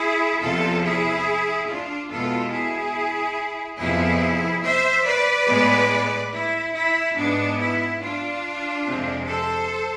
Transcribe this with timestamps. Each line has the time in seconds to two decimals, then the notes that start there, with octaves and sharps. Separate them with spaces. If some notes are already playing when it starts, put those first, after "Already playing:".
Already playing: E4 G#4
0.42 E2 C3 F3 F4 A4
0.84 E4 G#4
1.68 D4 F4
2.10 E2 B2 G#3 B3 F4 A4
2.52 E4 G#4
3.79 F2 C3 F3 B3 E4 G#4
4.63 C5 E5
5.05 B4 D5
5.47 A2 G#3 B3
6.32 E4
6.74 E4
7.16 G#2 G#3 B3 D4
7.59 E4
8.01 D4 F4
8.85 F2 C3 G#3 C4
9.27 A4 C5